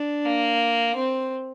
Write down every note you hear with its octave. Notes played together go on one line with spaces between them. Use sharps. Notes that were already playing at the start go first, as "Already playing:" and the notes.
Already playing: D4
A#3
C4